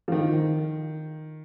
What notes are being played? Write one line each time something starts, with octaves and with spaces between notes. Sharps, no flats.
F3
D#3